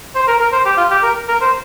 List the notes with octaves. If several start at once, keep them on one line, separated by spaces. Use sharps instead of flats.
C5
A#4
A#4
C5
G4
F4
G4
A#4
A#4
C5